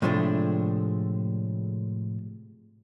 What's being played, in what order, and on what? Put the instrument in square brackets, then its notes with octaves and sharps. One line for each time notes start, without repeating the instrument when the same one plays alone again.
[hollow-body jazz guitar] A2 C3 F3 G#3 A3 D4